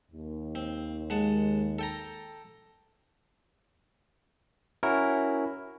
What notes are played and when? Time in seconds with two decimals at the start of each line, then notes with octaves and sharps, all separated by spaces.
0.11 D#2
0.55 C4
1.10 G#3 F#5 A5
1.79 A4 G5 A#5
4.83 C#4 E4 F#4 A#4